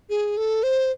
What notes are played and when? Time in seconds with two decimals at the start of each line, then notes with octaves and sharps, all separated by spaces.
0.10 G#4
0.37 A4
0.63 C5